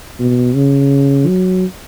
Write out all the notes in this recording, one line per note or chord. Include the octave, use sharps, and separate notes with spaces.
B2
C#3
F#3